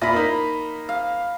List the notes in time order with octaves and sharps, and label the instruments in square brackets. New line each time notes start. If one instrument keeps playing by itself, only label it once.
[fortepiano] A#2 E4 [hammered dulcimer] A#5 B5
[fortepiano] A#3 D#4
[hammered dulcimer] F5